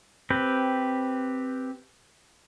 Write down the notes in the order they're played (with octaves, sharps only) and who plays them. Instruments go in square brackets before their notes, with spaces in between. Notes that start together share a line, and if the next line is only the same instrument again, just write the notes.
[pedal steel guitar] C4 G4 B4